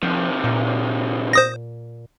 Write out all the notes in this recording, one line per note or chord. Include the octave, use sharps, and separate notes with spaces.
C3 D#3 F3
A#2
C5 D#6 A#6